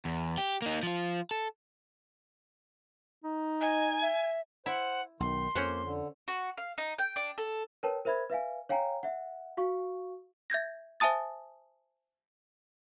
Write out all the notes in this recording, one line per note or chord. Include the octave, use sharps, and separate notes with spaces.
E2
G4
A#3 D#4
F3 F4
A4
D#4
D#5 G#5
E5
E4 C5 F#5
B1 D#3 C6
F2 A#3 C#4 C5 F#5
D3
F#4
F5
D#4
G5
D4
A4
A#4 B4 C#5 G5 A5
A#4 C5 E5 B5 G#6
B4 E5 F5 G#5
C#5 F5 G5 G#5 A#5
E5 F#5
F#4 F5 C#6
E5 G6 G#6 A#6
C5 E5 G#5 A5 D#6 A6